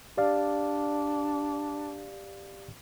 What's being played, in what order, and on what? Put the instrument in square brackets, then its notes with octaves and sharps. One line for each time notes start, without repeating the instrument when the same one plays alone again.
[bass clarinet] D4 [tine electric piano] G4 D5 F5